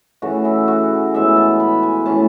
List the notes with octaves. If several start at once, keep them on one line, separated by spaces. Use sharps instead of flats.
C#3 E3 A3 F#4
E4
F#4
A2 E3 G#3 B3 E5
A5
B5
G#5
A2 E3 A3 C#4 A5